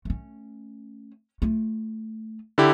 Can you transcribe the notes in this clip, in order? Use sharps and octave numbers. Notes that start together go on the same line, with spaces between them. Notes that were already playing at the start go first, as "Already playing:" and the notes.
A3 C#4
A3 F4
D3 E4 G4